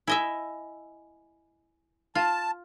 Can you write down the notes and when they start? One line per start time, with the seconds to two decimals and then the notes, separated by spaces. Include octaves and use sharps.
0.07 E4 D#5 E5 G#5
2.15 F4 A5